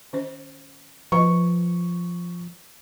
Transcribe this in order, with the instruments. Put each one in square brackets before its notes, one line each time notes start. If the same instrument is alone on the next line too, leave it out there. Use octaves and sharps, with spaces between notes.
[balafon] D#3 C#4 C5
[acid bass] F3 [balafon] B4 D#5 [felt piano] C#6